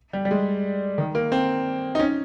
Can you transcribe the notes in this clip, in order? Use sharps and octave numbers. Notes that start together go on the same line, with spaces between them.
G3
G3
G#3
D#3
A#3
C4
D#4
C#4